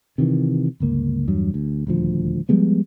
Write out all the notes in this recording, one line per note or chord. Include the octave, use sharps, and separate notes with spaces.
C3 D#3 E3
G1 C#2 A#3
E2 G2 F#3
D2
D#1 D2 F3
F3 G3 G#3 B3